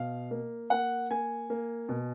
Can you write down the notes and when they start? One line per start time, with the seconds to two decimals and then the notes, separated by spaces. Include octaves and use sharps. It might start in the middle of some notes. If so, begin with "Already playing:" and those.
Already playing: B2 F5
0.31 A#3
0.70 A#3 F#5
1.11 A#3 G#5
1.50 A#3
1.89 B2